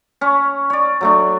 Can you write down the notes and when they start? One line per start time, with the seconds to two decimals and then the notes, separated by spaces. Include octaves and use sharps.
0.21 C#4 C#5
0.70 C#5 D5
1.01 F#3 A3 D4